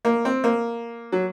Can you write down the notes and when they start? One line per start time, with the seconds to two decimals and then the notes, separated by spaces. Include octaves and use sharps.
0.05 A#3
0.25 C4
0.44 A#3
1.12 F#3